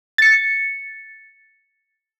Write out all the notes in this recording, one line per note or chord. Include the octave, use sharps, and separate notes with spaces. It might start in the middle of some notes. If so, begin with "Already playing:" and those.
A6 C#7